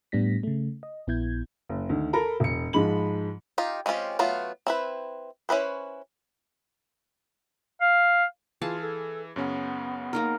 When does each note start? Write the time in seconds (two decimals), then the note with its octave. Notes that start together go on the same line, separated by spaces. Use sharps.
0.12 A2 G3 B3 D4 A#6 B6
0.43 C#3 A3
0.83 D#5
1.07 A#1 B3 E4 G6 G#6
1.69 F#1
1.89 D2 D#3
2.13 A4 A#4 A#5 B5
2.40 E1 C#7
2.73 G#2 F3 G#3 B5 F#7
3.58 D#4 F4 G4
3.86 G#3 C4 C#4 F4 G4
4.19 F#3 A3 B3 F4
4.67 C4 E4 B4
5.49 C#4 E4 B4 C5
7.81 F5
8.61 E3 F4 G#4 F5 A5
8.81 A4
9.36 F#2 C#3 B3 C#4
10.13 A#3 D#4 A#4